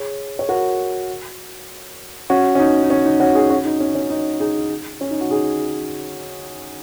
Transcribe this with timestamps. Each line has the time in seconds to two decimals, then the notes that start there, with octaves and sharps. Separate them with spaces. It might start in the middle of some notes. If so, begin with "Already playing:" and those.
Already playing: G#4 C#5
0.39 C#5
0.49 F#4 A#4
2.30 C#4 F#4
2.55 C#4
2.59 D#4
2.83 D#4
2.90 C#4
3.05 D#4
3.20 C#4 F#4
3.35 D#4 G#4
3.50 C#4 F#4
3.65 D#4
3.80 C#4
3.95 C#4
4.10 D#4
4.40 D#4 G#4
5.01 C#4
5.11 D#4
5.21 F#4
5.31 D#4 G#4